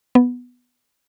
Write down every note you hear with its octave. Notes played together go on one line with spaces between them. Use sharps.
B3